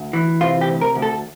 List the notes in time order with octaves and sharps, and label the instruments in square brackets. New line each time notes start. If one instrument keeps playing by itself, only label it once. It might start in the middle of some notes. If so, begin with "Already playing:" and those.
Already playing: [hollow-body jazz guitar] D2
E3
C3 F4
G4
D2
A#4
D2
A4